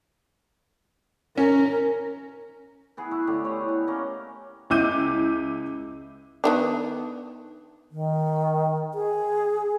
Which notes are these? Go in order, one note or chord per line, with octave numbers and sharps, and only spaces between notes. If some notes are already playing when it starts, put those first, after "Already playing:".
C#4 A#4
E3 B3 G#4
E4 F#4
A2 D3 G4
C5 C#5 D#5
B3
A#3 C#4
C#2 E4 D6 G6 D#7
D#3 B3 D4
D#3
G#4